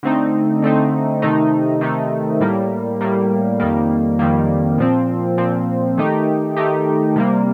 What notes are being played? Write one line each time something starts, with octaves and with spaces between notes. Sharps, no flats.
D3 A3 C4 D#4
D3 A3 C4 D#4
C3 D#3 A3 D#4
C3 D#3 A3 D#4
A2 G3 A#3
A2 G3 A#3
F2 D#3 G3 A#3
F2 D#3 G3 A#3
A#2 F3 C4
A#2 F3 C4
D#3 A3 D#4 G4
D#3 A3 D#4 G4
C3 G3 A#3